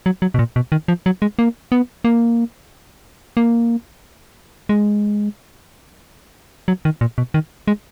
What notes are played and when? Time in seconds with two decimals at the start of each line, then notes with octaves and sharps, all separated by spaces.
0.06 F#3
0.22 F#3
0.34 B2
0.39 A#2
0.56 B2
0.72 D#3
0.88 F3
1.06 F#3
1.22 G#3
1.39 A#3
1.72 B3
2.04 A#3
3.37 A#3
4.69 G#3
6.68 F#3
6.85 D#3
7.01 A#2
7.18 B2
7.34 D#3
7.68 G#3